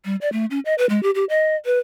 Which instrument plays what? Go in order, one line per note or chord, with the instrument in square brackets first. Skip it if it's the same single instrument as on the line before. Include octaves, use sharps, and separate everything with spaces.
[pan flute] G3
D5
A3
C#4
D#5
B4
G#3
G4
G4
D#5
B4